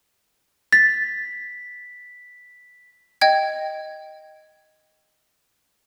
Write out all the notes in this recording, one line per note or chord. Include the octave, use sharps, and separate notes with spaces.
A6 B6
D#5 G5 G#6